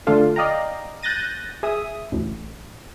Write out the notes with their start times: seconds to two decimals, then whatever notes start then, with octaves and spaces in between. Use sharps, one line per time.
0.07 D3 A3 D4 F4 A4
0.36 D5 D#5 F5 G5 A#5
1.03 F#6 G6 A6 A#6 D#7
1.63 G#4 E5 D#6
2.12 A1 D2 A2